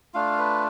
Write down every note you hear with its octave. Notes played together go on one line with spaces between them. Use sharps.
A3 D4 F4 F5
B4